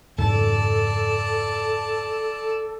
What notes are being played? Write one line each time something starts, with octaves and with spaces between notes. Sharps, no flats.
F2 G#2 C#3 A4 D5 A5